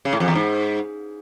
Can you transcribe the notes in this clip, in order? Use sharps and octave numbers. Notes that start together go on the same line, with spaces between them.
C#3
A2
F2
E2
G#2